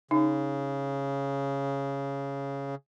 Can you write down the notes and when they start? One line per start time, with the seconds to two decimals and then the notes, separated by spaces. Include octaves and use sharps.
0.11 C#3 D#4